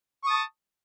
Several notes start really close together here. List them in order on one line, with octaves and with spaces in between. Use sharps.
C#6 D#6 A5